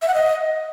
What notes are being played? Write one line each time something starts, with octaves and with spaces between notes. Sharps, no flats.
E5
F#5
D#5